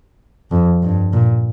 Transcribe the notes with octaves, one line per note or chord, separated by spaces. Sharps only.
F2
G2
A#2